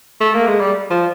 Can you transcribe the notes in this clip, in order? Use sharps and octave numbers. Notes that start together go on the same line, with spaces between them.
A3
A#3
G#3
G3
F3